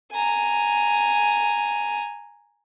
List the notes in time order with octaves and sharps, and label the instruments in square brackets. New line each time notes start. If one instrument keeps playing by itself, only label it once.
[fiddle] G#5 A#5